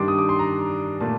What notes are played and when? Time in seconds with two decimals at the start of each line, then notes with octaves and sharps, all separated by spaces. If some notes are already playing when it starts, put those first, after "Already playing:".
Already playing: G2 D#3 G3 D4 C6 D6
0.08 D#6
0.19 D6
0.29 C6
0.39 A#5
1.00 A#2 A3 A5